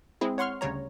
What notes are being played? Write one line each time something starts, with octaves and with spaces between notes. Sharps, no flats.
G#3 C4 E4 G#4
C#5 F#5 C6 C#6 F6
D2 C#3 G3 C#5 A#5